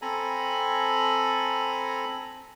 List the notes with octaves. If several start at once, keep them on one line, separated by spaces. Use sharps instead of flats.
C4 A4 G#5 A#5 B5